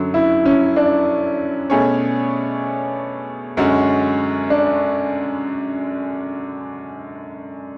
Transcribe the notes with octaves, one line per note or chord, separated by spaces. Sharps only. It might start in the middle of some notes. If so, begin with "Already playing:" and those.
Already playing: F#2 D3 F#3
E4
C#4
D4
B2 A3 C#4 G#4 C#5
F#2 D3 G#3 C#4 F#4
D4